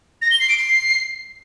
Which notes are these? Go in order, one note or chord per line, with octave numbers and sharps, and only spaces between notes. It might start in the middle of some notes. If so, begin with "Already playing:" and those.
A#6
G7
C7
D7
C7